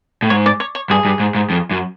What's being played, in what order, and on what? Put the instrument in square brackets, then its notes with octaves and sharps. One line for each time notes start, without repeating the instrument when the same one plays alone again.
[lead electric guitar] A2
[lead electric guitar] G#2 [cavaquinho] C#5
[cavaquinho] D5
C#5
C#5
[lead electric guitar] G2 [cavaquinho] G#4
[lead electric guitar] G2
G#2
G#2
F2
F#2